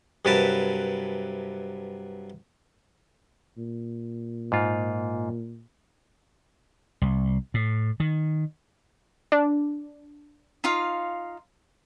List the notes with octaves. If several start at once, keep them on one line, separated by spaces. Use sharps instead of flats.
G2 C3 F#3 A#4 B4 A5
A#2
G#2 F4
C2
A2
D#3
D4
D#4 F4 F5